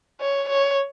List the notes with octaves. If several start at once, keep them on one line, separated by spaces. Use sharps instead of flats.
C#5
C#5